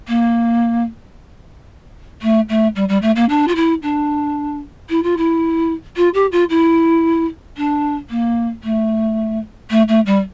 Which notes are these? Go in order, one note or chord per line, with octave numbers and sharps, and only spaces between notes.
A#3
A3
A3
G3
G3
A3
A#3
D4
F4
E4
D4
E4
F4
E4
F4
G4
F4
E4
D4
A#3
A3
A3
A3
G3